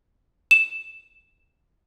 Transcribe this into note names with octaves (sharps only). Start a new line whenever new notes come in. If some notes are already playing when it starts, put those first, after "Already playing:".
E7